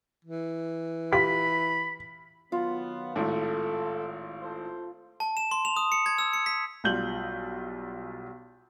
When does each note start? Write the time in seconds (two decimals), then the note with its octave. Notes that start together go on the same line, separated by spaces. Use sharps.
0.25 E3
1.13 F4 G4 B5 B6
2.52 D#3 F#3 B3 F4
3.16 G#1 A2 A4
4.42 F4 A4 C5
5.20 A5
5.37 E7
5.51 C6
5.65 F7
5.77 D#6
5.92 C#7
6.06 G#6
6.18 E6
6.33 C#7
6.46 B6
6.84 B1 G3 F4 G6 F#7